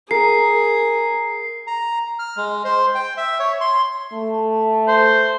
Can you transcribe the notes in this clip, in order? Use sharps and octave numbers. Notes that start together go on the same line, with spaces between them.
G#4 A#4 C7
A#5
F6
G#3
C5
G5
E5
C#5
C6
A3
C5